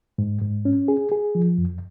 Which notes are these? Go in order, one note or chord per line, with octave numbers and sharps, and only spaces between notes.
G#2
G#2
C#4
G#4
G#4
F3
F2